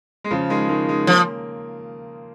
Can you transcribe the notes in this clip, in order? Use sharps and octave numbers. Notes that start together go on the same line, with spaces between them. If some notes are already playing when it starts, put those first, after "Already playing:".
G#3
C#3 F3
D#3 G#3
D#3 G#3
D#3 G#3
F3 A#3